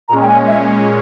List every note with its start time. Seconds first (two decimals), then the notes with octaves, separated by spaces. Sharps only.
0.09 A#2 G#3 C#4 A#5
0.22 G5
0.28 G#5
0.47 E5